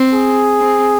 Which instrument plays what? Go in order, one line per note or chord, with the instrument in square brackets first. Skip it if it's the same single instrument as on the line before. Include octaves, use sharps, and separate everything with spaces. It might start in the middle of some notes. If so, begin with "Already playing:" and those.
Already playing: [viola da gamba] C4
[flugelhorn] G#4
[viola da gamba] C4